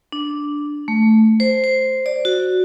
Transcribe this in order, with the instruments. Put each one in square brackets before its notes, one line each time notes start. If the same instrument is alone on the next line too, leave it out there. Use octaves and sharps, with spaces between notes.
[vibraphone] D4
A3
C5
C5
D5
F#4